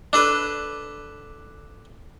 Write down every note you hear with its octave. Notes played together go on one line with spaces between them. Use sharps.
D4 A4 B4